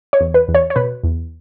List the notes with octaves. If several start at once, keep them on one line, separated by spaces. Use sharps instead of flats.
C#5
E2
B4
E2
C#5
C#5
B2 B4
E2